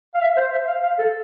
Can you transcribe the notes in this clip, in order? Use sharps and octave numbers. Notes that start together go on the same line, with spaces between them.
F5
E5
C5
E5
F5
F5
A4